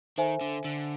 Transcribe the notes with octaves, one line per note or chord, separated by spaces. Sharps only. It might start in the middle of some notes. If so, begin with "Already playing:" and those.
D#3 A4 C5 E5 G#5
D3
D3